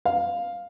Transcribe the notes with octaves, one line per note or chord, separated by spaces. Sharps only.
F5